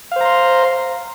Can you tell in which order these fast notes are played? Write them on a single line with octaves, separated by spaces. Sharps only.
F5 C5 A#5 C6